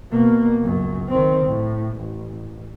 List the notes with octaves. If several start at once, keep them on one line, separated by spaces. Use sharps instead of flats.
B2 A#3
C#2 F#2
D#3 C4
A2
A1